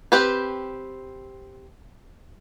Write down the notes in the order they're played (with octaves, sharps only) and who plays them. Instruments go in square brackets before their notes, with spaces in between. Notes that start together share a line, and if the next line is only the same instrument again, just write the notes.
[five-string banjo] C4 G4 B4